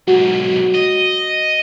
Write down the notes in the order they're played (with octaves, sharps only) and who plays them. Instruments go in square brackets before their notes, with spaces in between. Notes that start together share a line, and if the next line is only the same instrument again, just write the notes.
[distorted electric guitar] B1 G#2 [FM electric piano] F#4
[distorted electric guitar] D#5